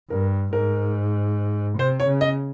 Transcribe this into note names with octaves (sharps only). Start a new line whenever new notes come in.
G2 A#4
G#2 A#4
C3 C5
C#5
C#3
D#5